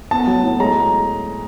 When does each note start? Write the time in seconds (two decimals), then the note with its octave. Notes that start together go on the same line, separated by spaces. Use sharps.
0.11 B3 A5
0.27 F#3
0.43 A2
0.60 G#3 A#5